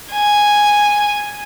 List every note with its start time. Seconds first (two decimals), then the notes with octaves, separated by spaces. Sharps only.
0.12 G#5